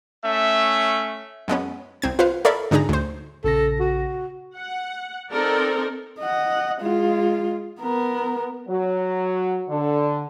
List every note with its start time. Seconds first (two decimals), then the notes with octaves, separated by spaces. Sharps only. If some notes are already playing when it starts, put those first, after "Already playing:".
0.24 A3 C#4 E5
1.48 F#2 G#3 B3 C#4
2.02 C2 C4 G#6
2.19 F4 B4 C5 F5
2.45 A4 A#4 C#5 D5 E5 B5
2.71 G#2 D3 D#4 G#4 A#5
2.89 D2 C5
3.44 A#1 C#3 A4 A#6
3.80 F#4
4.56 F#5
5.31 C4 D#4 A4 A#4 D5
6.20 D#5 F#5
6.81 G#3 F4
7.80 B3 A#4
8.68 F#3
9.69 D3